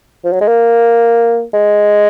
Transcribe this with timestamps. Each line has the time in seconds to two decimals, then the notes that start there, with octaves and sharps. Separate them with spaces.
0.24 F3
0.33 F#3
0.41 G#3
0.48 A#3
1.54 G#3